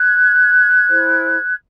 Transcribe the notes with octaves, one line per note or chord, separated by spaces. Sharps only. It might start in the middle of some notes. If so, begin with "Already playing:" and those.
Already playing: F#6 G#6
E4 G#4 C5